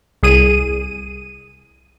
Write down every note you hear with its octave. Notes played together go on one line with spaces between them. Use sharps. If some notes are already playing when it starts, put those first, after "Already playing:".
C2 G#4 D#7